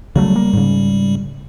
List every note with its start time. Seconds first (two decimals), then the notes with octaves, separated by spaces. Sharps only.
0.16 C#3 F#3 G3 A3
0.35 A#3
0.53 G#2 C#3